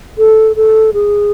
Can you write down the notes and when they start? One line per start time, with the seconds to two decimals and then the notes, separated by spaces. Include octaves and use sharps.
0.18 A4
0.56 A4
0.94 G#4